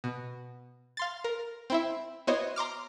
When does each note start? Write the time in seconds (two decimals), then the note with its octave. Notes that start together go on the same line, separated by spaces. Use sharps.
0.04 B2
0.97 F5 C6 A6
1.24 A#4
1.70 C4 E4 E5
2.27 B3 E4 F#4 C5 C#5 D#5
2.56 A#5 C6 D6 F6